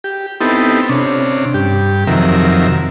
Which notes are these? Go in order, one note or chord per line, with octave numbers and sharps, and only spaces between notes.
G4
B3 C4 D#4 E4 G4 A4
C3 C#4 D4
G2 G4
F2 C3 D#3 F#3 A#4 E5